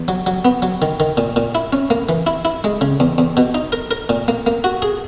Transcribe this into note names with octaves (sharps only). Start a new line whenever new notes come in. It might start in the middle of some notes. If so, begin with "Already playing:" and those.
Already playing: E2
F#3
F#3
B3
F#3
D#3
D#3
A#2
A#2
E4
C#4
A#3
E3
E4
E4
G#3
C#3
E2
E2
B2
D#4
A#4
A#4
A#2
A#3
A#3
F#4
G#4